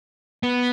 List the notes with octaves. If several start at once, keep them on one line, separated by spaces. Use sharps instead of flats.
B3